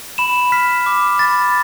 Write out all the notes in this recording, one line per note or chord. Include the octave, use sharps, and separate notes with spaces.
B5 E7
F6 B6
D6
B5 A6